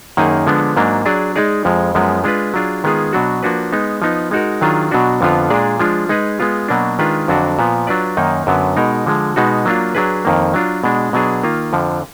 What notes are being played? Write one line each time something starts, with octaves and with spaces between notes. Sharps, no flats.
F#2 D#3 A#3 D#4 G#4
D3 F3 G#3 B3 D4
G#2 F#3 A#3 D4
F#3 D4 G#4 D5
G#3 D#4 G#4 D5
F2 F3 G#3
F#2 F3 G#3 B3
G#3 D4 F4 B4
F#3 D4 F4 G#4
D#3 G#3 B3 F4 G#4
B2 F#3 D4 F#4
F3 A#3 D4 F#4 B4
G#3 B3 D#4
F3 B3 D#4
G#3 D#4 F#4 A#4
D#3 F#3 D4 F4 G#4
B2 F#3 D4 F#4
F2 D3 F3 B3 F4
A#2 G#3 D4 G#4 D5
F3 G#3 D4 F4
G#3 D#4 G#4 B4
G#3 B3 F4
B2 F#3 A#3 D4
D#3 G#3 D4 F4 B4
F2 D3 F#3 D4 F#4
A#2 F3 B3
F#3 D4 F4 B4 D5
F#2 D#3 A#3 D#4
F#2 D3 F#3 B3
B2 G#3 D#4 A#4
D3 F3 G#3
B2 G#3 B3 D#4 F#4
F#3 A#3 D4 F4
F#3 D4 G#4 B4
F2 D#3 A#3
F#3 D4 F4
B2 G#3 D4
B2 F#3 B3 D4 G#4
D#3 A#3 F4
F2 D3 F3